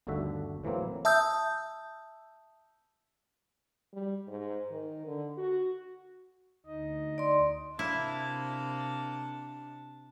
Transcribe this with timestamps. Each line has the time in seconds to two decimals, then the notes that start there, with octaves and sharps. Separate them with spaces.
0.07 G1 D#2 D3 A3 F#4 E5
0.64 A2 E3 F#3 A#3 C4
1.05 E5 A5 D#6 E6 G6
3.93 G3
4.27 G#2
4.71 D#3
5.07 D3
5.38 F#4
6.66 D2 D#4 D#5
7.18 D5 C6
7.79 C3 A#3 D4 E4 A5